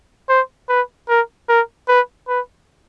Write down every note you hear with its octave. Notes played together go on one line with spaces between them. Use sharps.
C5
B4
A#4
A#4
B4
B4